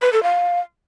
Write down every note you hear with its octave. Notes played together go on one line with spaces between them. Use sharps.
B4
A4
F5